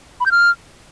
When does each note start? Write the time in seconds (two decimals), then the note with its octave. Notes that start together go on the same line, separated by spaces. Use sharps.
0.20 B5
0.26 G6
0.31 F6